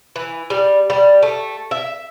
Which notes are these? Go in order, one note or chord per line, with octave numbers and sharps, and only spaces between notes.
E3
G3
G3
A3
E5